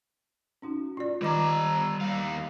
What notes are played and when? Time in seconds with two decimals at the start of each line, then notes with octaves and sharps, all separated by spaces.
0.62 C#4 D#4 F#4
0.97 F4 D5
1.22 D#3 G3 D#5 A#5 D6
2.01 D#2 F5